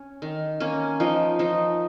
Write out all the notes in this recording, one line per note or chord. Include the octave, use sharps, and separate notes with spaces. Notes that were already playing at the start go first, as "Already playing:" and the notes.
Already playing: C#4
D#3
A#3 C#4
F3 D#4
F3 D#4